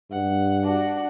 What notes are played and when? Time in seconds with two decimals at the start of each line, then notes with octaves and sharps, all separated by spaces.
0.11 G2 F#5
0.63 D4 F#4